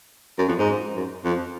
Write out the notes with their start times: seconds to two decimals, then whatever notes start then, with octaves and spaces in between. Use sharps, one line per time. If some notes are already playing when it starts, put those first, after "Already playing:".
0.38 F#2
0.48 F2
0.58 G#2
0.96 F#2
1.24 F2